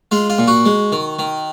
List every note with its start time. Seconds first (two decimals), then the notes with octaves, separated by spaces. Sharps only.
0.11 G#3 F4
0.30 F4
0.38 A#2
0.48 F#4
0.65 G#3
0.92 D#3
1.19 D#3